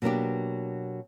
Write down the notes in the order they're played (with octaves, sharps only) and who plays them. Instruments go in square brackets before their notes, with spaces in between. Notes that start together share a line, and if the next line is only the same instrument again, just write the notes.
[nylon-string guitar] B2 F#3 A#3 D4 G4